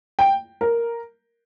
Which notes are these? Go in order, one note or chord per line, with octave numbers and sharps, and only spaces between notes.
G5
A#4